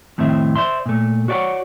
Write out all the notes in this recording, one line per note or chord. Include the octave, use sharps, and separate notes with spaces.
F2 A2 D#3 C4 E5
C5 D5 E5 C6
A#2 A3
F#4 C#5 D5 F5 F#5